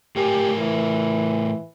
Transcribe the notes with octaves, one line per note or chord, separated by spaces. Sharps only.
A2 G4 A#4 G#5
E3